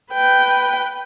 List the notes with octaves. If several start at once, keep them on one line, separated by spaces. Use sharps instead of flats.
B4 G5